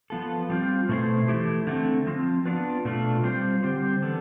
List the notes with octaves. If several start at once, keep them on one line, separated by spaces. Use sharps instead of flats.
F3 B3 F4 A4
G3 C4 F4
B2 A3 E4 A4 C5
E3 A3 E4 G4
D3 A3 C4
F3 C4 F4
B3 D4 F4 B4
B2 A3 D4 F4
G3 C4 F4 C5
D3 G3 C4 G4 C5
E3 G3 B3 D4 A4